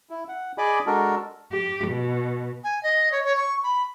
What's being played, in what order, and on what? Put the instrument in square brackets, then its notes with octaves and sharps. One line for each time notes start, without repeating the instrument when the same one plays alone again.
[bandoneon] E4
F#5
G#4 D5 D#5 G#5 B5 D6
G#3 D4 F#4 A4 A#4
[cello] G4
B2
[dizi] G#5
D#5
C#5
C#5
C#6
B5